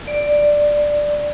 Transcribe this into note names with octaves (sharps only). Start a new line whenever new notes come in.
D5